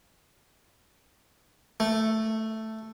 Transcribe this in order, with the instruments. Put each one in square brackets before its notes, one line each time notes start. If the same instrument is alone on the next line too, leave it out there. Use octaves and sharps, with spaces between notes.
[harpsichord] A3